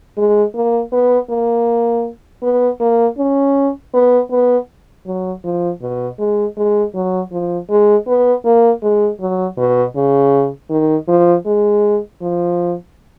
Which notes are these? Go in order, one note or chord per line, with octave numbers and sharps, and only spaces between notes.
G#3
A#3
B3
A#3
B3
A#3
C#4
B3
B3
F#3
F3
B2
G#3
G#3
F#3
F3
G#3
B3
A#3
G#3
F#3
B2
C#3
D#3
F3
G#3
F3